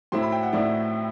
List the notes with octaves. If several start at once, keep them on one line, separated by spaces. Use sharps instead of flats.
A2 F#3 C4 E4 C6
B5
G5
F#5
A2 F#3 C4 E4 D5